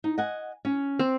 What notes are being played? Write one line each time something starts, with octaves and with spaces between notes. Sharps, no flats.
D#4
D#5 F#5 G#5
C#4
C4